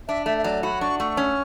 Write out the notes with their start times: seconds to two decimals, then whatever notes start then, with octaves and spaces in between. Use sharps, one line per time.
0.08 D4 E5
0.26 A3 E5
0.38 E5
0.44 F#3 D5
0.63 F#4 B5
0.81 D4 C#6
1.00 A3 C#6
1.17 C#4